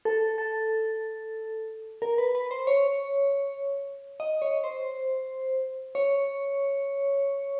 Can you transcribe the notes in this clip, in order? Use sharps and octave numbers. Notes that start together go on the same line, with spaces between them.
A4
A4
A#4
B4
B4
C5
C#5
D#5
C#5
C5
C#5